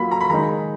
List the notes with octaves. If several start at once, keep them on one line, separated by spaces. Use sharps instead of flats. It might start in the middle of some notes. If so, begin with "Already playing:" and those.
Already playing: F#3 A#3 F4 B5
A#5
B5
D#3 G#3 D#4 A#5